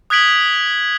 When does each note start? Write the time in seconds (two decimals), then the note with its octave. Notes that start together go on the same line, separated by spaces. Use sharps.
0.10 D#6 F#6 G#6 B6 D7 F#7